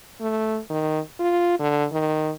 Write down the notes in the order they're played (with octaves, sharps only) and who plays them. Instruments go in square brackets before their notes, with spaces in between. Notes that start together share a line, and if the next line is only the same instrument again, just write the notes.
[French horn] A3
D#3
F4
D3
D#3